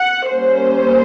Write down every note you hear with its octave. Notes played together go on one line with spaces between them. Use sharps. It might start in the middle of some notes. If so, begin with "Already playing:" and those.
Already playing: F#5
G3 A#3 C#4 C5